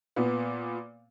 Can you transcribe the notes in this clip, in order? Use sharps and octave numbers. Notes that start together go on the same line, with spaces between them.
A#2 B3